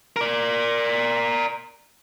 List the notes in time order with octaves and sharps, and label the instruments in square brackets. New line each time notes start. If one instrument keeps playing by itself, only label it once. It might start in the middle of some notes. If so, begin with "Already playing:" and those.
[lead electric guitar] A#4 D5